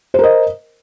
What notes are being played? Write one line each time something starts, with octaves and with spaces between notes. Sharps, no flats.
A#4 C5 D#5